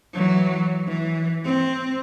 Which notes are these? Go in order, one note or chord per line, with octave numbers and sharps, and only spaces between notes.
E3 F#3
E3
C4